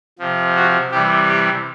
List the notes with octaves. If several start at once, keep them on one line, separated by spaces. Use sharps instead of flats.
C3 F3
F#4
C3 E3 G3 G4
G4